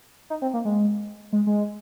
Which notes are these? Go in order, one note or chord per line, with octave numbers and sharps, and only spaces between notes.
D#4
C4
A#3
G#3
G#3
G#3